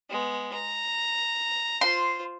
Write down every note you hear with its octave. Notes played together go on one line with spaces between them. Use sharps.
G#3 B3
A#5
F4 C5 C6